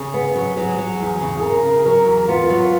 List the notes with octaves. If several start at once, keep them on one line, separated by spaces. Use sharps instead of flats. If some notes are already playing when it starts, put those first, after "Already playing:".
Already playing: C#3 G#4
B3
F#3
F#3
F#3
E2
C#3
C#3 A#4
C#3
F#3 A#4
E2
B3 F4
F#3